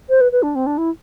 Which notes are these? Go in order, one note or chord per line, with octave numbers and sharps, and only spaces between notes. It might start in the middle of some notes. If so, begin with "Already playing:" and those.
C5
B4
B4
D4
C4
D4
E4